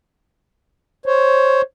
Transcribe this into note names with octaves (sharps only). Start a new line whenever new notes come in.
C5 C#5